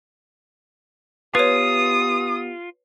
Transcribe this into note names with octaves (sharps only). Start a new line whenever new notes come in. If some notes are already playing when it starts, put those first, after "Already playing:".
B3 F4 G4 B4 C#5 D#6